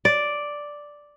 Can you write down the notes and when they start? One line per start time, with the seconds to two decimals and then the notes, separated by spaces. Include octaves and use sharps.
0.05 D5